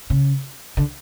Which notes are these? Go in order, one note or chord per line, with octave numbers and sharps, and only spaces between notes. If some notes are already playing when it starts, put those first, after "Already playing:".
C#3
D3